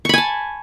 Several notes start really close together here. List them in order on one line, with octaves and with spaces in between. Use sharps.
C#6 B5 G#5 A5